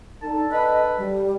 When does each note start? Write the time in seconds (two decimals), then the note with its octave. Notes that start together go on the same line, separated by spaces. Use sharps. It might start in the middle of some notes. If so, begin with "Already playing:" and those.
0.22 D3 D#4 A4 A5
0.51 B4 D#5
0.98 G3